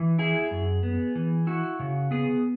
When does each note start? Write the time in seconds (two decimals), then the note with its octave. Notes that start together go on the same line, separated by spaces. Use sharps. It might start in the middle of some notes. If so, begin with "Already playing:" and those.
Already playing: E3
0.19 E4 G#4
0.51 F#2
0.83 B3
1.15 E3
1.47 E4 F#4
1.80 C#3
2.11 B3 G#4